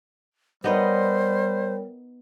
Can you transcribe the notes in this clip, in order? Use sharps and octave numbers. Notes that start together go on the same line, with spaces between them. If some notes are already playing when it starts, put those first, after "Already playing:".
G3 B3 D#4 A#4 C5 C#5 D#5 G5